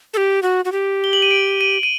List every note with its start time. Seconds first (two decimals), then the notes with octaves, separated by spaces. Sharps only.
0.13 A4
0.17 G4
0.43 F#4
0.65 F#4
0.72 G4
1.04 G7
1.13 F#7
1.22 D#7
1.31 D7
1.61 D#7
1.83 D#7